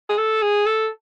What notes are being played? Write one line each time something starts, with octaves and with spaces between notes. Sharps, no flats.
G#4
A4
G#4
A4